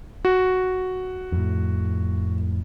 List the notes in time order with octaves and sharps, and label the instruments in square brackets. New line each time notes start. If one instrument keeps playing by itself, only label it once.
[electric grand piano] F#4
[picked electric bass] F2 A2